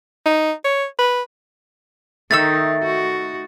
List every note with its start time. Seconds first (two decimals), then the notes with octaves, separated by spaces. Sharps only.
0.26 D#4
0.64 C#5
0.98 B4
2.31 D#3 A3 D#4 E6 A6
2.83 F#4